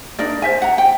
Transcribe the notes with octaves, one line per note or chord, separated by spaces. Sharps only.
D4 D#4 A#4 D5
C5 E5 G#5
F#5 A#5
G5